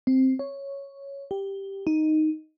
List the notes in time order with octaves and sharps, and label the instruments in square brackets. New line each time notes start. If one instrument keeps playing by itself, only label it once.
[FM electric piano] C4
C#5
G4
D#4